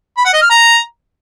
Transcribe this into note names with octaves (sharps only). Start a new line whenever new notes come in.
B5
F#5
D#5
F6
A#5